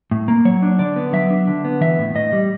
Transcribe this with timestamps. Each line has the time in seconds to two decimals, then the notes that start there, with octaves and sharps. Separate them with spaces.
0.11 A2
0.28 A#3
0.45 F#3 C#5
0.62 D4
0.79 D3 D5
0.96 B3
1.13 F#3 E5
1.30 D4
1.47 D3
1.65 B3
1.81 E3 E5
1.99 A2
2.15 A2 D#5
2.33 G3